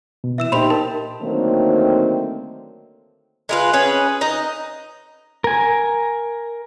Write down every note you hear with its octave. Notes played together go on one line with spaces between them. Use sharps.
B2
E3 E5 E6 E7
A#2 D#4 G4 C5 B5 C6 F7
A#4 A5
D3 D#3 F#3 A3 A#3 C4
G#3 F4 B4
C#4 G#4 B4
D#4 D#5
A#4 G#5